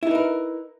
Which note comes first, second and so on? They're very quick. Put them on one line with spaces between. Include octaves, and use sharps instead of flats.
E4 D#4 B4 A#4